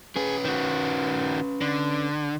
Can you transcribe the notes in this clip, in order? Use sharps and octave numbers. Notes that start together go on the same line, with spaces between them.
C#4 G#4 B4
D#3 F#4
D3